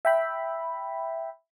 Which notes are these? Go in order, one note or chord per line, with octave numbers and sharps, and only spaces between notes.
E5 G5 B5